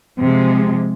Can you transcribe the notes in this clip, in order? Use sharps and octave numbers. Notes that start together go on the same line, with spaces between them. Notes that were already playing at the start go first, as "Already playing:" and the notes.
C3 F3 G#3